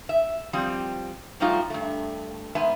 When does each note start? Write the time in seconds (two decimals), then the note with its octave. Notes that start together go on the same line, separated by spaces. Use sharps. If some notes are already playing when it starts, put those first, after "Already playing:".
0.09 E5
0.53 F3 G3 C4
1.40 F3 G3 A3 D#4 F4 F#4
1.70 G2 A3
2.55 G#2 B3 E5 G#5